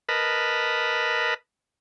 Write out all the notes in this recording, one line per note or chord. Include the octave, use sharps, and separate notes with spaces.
A#4 B4 D#5 A5 B5